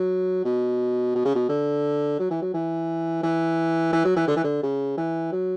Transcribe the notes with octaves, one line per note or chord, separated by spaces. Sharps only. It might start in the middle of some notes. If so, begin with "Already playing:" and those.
Already playing: F#3
B2
B2
C#3
B2
D3
F#3
E3
F#3
E3
E3
E3
F#3
E3
D3
E3
D3
C#3
E3
F#3